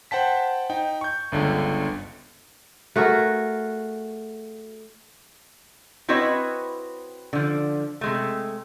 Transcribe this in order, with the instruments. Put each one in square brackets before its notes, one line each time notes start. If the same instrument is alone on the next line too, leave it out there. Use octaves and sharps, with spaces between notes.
[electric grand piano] C5 F#5 G5 A5 B6
D#4 G5
C#6 G6
G1 C#2 D3
[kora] A3 F#4 G#4 A#4
[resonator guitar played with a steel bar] C4 E4 F#4 B4 C#5 D#5
D3 F3
C3 G#3 A3